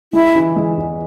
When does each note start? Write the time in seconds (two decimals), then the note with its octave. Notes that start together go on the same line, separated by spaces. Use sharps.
0.13 G#3 E4
0.35 E3
0.56 G#3
0.78 E2